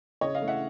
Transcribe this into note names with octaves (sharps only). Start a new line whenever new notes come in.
C#3 C#5 D#5
D#5 F5
E3 A3
E5 F#5